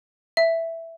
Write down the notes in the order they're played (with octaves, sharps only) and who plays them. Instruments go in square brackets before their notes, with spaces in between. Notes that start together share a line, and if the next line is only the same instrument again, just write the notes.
[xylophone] E5